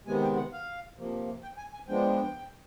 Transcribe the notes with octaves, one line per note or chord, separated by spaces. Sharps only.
C3 D#3 G#3 B3 G#5
G5
F#5
F5
C3 F3 A#3
G5
G#5
G#5
F3 G#3 B3 D4 G5